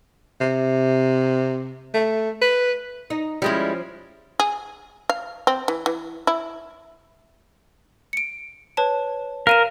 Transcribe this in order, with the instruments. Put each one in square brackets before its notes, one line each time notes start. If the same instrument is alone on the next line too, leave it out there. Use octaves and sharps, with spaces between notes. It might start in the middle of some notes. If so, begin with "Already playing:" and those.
[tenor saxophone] C3
A3
B4
[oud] D#4
[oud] F3 C#4 [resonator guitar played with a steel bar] G3 G#3 E4
[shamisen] G#4
F5
C4
E3
E3
E4
[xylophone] C#7 D7
B4 C#5 A5
[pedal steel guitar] A#4 [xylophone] F5 D#7 E7